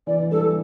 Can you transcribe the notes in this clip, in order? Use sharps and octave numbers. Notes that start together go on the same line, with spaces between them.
E3 D5
E3
G3 A4
E3